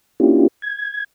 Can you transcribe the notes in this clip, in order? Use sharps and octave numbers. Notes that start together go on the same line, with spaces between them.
A#3 C#4 D4 E4 F4 G4
G#6